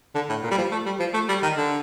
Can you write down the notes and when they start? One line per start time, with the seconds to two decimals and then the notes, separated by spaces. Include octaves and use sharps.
0.15 D3
0.29 A2
0.44 A#2
0.51 G3
0.58 F3
0.72 A3
0.86 G3
1.00 F3
1.14 A3
1.28 G3
1.42 D#3
1.57 D3